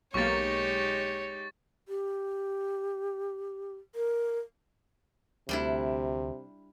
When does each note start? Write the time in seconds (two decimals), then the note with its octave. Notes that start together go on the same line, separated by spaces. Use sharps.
0.14 B1 G#3 A#3 D#4 G4 C#5 C#6 A6
1.88 G4
3.95 A#4
5.49 D2 C3 G3 D4 E4